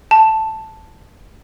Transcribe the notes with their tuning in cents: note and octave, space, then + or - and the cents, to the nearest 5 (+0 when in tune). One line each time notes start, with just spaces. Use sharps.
A5 +0